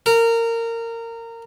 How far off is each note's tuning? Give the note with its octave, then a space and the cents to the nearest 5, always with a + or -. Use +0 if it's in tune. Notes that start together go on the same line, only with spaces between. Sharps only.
A#4 -20